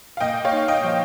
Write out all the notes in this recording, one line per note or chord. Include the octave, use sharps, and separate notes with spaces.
F5
A#2 D#5 G5
C#5 F5
D#4
D#5 G5
F3